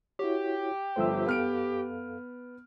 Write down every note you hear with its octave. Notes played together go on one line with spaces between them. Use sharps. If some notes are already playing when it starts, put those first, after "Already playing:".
E4 F#4 G4 C#5
G1 F3 A3 C5 E5 E6
F#2 B3 A4 F5 F6 D7